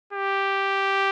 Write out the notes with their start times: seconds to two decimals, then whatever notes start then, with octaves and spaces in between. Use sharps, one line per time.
0.13 G4